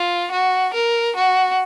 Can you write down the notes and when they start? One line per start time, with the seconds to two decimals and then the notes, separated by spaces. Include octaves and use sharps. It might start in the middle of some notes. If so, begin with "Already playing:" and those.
Already playing: F4
0.31 F#4
0.74 A#4
1.16 F#4